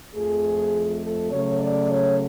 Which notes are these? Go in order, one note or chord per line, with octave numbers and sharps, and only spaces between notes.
F2 F3 A3 G#4
A4
C#3 F#3 A3 C#5
D5
C#5